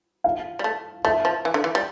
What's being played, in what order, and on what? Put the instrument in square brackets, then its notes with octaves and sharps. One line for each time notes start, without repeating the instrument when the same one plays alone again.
[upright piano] F5
[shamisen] G3
A3
[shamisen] A3 [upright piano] E5
[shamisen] F3
E3
D3
E3
G3